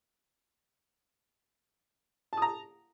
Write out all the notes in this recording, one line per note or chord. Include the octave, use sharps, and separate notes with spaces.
A5 A#5 D#6